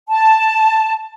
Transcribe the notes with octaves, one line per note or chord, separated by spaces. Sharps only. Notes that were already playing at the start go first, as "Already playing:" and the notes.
A5